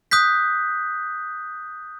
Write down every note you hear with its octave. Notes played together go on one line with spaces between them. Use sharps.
D#6 F#6 G6 B6